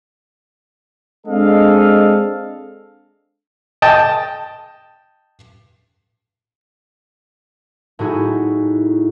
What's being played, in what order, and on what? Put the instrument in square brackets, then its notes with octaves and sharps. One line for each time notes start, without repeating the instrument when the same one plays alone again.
[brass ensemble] G#3 C4 D4 A4 D#5 F5
[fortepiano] D#5 G5 A5
[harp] A2 D#4 E4 F#4 G#4